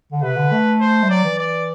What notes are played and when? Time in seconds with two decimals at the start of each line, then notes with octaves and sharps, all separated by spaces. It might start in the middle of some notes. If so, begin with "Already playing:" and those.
0.12 D3
0.22 C3 B4
0.36 D3
0.52 A3
0.81 C5
1.03 G3
1.10 F#3 D5
1.24 E3
1.39 D5